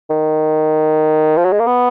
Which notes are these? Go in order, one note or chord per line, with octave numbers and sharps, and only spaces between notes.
D#3
F3
F#3
G#3
A#3
B3